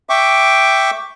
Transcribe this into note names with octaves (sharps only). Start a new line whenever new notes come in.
E5 G5 C#6 D6